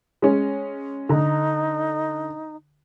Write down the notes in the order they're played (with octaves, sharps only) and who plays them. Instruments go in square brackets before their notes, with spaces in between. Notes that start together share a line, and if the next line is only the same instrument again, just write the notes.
[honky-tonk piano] G#3 C#4
[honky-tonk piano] D3 A#5 [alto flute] D#4